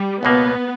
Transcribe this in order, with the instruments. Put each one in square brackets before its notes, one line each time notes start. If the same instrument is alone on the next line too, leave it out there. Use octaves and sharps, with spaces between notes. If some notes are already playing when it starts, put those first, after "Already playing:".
Already playing: [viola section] G3
[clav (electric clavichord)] C#2 B2 A#3 [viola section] B3